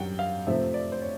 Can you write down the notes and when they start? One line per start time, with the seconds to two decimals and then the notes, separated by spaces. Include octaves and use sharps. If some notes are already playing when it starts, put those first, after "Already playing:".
Already playing: F#2 D#3 G3 F#5 G5
0.19 F5
0.47 F2 C3 F3 A3 C4 E5
0.74 D5
0.92 C5
1.02 C#5